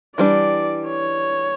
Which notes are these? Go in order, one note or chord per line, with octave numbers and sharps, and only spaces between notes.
E3 G3 D4 D5
C#5